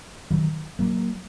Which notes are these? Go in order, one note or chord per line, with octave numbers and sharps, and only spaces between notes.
D#3 F#3
F#3 A#3